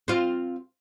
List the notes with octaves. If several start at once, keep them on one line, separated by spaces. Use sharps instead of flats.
C4 F4